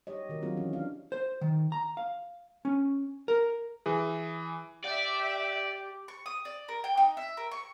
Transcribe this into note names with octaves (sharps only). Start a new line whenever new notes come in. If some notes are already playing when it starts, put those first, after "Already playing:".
G4 C#5 D#5
D#3 F#4 A#4
F#3 C4 D4 F4 F#4 G#4
E3 C#4
D4 F5
C5
D#3
A#5
F5
C#4
A#4
E3 G#4
G4 D5 E5 G5
C#6
D#6
D5
A#4
G5
D#4
E5
A#4
C#6